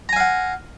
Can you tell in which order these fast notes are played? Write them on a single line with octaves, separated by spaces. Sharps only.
A#5 G#5 F5 F#5